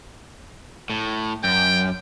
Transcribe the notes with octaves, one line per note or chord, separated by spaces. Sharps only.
A2
F#2 G5